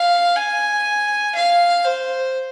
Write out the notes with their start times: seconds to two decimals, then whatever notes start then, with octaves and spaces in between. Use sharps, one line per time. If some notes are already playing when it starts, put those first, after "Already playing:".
Already playing: F5
0.36 G#5
1.35 F5
1.85 C5